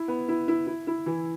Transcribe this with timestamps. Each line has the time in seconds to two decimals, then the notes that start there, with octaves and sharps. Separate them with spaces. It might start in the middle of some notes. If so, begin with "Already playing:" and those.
Already playing: E4
0.08 B3
0.28 E4
0.48 E4
0.67 E4
0.87 E4
1.06 E3